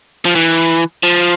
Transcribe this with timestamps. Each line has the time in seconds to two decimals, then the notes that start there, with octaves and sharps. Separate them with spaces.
0.25 F3
0.35 E3
1.03 F3